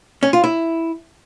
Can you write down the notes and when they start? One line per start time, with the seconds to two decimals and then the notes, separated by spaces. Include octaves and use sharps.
0.23 C#4
0.33 F4
0.44 E4